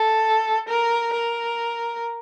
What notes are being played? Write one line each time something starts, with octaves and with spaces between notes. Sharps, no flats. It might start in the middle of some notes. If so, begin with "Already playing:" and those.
Already playing: A4
A#4
A#4